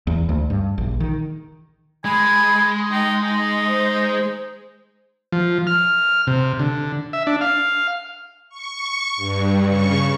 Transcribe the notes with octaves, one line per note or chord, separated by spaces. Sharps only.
E2
D2
G2
A#1
D#3
G#3 G#5 B5
D#4 G5
D#4 G#5
C5
F3
F6
C3
D3
E5
D4
F5
C#6
G2
C#3 C#6